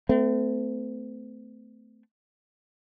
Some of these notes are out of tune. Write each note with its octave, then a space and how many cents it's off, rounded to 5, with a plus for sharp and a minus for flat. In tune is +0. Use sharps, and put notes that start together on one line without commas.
A3 +0 C4 -45